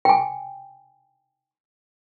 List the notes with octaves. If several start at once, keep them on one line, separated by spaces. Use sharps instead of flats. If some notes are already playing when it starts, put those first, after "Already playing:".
G5 G#5